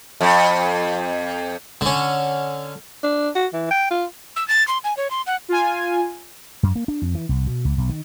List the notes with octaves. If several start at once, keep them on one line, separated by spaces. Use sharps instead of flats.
F2
D3 C#4
D4
F#4
E3
G5
F4
E6
A6
C6
G#5
C#5
C6
F#5
F4 G#5
F#2
A#3
D4
F2
E3
C2
B2
C#2
B1
D#3